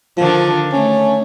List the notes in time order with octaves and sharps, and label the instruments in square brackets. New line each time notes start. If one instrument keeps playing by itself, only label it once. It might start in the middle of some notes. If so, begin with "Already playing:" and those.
[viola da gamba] D3 D#3 D4 [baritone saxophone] F3
[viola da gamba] A3 [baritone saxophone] C#4